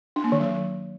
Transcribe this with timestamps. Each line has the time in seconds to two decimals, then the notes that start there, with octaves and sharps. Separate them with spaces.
0.16 D4
0.24 A#3
0.32 D#3
0.40 F#3